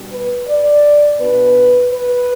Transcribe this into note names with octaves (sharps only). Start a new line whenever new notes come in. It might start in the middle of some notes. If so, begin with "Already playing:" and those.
Already playing: B2 G3 D4
B4
D5
B2 B3 D4 B4
B4